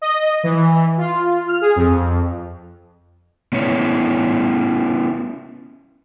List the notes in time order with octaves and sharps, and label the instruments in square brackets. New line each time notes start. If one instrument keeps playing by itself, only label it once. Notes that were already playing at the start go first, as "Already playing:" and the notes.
[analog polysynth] D#5
E3
F4
F6
G#4
F2
[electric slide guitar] B3 C#4 E4 C#5